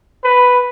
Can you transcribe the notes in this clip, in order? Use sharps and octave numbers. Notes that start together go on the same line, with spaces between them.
B4